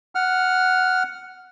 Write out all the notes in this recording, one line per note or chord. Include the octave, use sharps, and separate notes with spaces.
F#5 F6